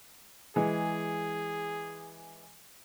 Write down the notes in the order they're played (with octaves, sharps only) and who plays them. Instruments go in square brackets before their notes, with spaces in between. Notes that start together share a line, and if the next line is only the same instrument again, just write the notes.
[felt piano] E3 G#3 [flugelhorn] G#4